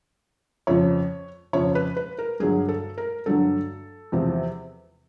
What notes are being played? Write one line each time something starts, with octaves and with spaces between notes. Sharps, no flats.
F2 C#3 F3 C#5
F2 C#3 F3 C#5
B4
B4
A#4
G2 D3 F#3 G#4
A4
A#4
G2 D3 F#3 A4
E2 C3 F3